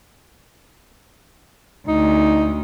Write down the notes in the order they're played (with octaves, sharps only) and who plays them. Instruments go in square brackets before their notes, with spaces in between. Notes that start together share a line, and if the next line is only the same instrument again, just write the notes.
[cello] D2 [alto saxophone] D#4